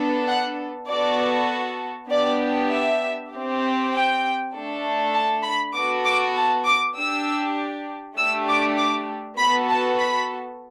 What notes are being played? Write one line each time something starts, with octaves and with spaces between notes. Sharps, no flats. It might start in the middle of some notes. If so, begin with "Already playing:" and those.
Already playing: B3 D4 A4
F#5
B3 F#4 A4 D5
B3 D4 G4 D5
E5
C4 G4
G5
A3 D4 A4
A5
B5
B3 F#4 A4 D6
D6
A5
D6
D4 G4 E6
A3 D4 G4 E6
D6
D6
B3 F#4 A4 B5
A5
B5